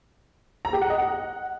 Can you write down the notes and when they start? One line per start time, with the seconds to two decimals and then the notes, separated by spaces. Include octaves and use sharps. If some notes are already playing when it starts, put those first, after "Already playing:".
0.65 A#5
0.73 G4
0.81 F#5
0.90 D#5
0.98 F#5